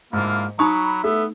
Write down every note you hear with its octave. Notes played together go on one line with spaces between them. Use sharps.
G#2 D3 A#3 E4 F4
F#3 D#4 A#5 B5 C#6 D#6
A3 B3 E4 E5